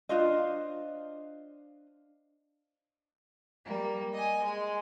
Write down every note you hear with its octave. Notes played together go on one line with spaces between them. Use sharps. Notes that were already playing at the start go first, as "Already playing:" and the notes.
D4 F4 C5 D#5
G3 A#3
D#5 G#5
G#3